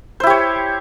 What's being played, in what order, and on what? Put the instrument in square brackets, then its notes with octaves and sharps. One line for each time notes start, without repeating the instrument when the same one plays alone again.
[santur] C5
E4
G4
C#5